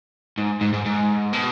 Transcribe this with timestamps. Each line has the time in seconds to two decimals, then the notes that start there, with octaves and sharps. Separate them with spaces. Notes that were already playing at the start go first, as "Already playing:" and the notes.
0.38 G#2
0.61 G#2
0.73 G#2
0.85 G#2
1.33 B2